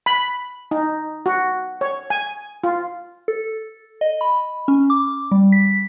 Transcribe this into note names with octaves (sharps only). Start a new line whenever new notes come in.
B5
D#4
F#4
C#5
G#5
F4
A4
D#5
B5
C#4
D6
G3
B6